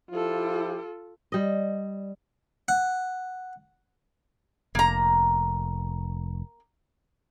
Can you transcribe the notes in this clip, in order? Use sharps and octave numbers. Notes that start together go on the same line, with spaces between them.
F3 E4 F4 G4 A4
G3 D#5
F#5
F1 A#3 A#5